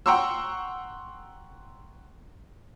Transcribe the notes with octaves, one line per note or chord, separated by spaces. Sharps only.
F#5 G5 A#5 C6 C#6 E6